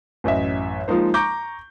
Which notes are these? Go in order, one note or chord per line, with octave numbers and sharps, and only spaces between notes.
A1 F#2 D#5 E5
F3 G#3 A#3 D#4 C5
A#5 C#6 D6 G6